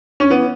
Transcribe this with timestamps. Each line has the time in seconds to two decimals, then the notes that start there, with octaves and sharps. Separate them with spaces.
0.20 C#4
0.30 E3 B3